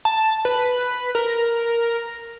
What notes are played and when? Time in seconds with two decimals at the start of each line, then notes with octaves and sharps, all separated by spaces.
0.05 A5
0.45 B4
1.15 A#4